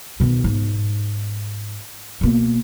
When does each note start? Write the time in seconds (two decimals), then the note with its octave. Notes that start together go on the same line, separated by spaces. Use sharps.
0.20 B2 D#3
0.44 G#2
2.21 B2 A#3